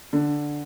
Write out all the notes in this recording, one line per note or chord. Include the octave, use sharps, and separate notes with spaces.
D3